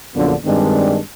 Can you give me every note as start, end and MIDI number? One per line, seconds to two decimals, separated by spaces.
0.15 0.33 34
0.15 0.33 42
0.15 0.33 50
0.15 0.33 59
0.15 0.33 62
0.15 0.33 65
0.45 0.98 43
0.45 0.98 51
0.45 0.98 56
0.45 0.98 60
0.45 0.98 62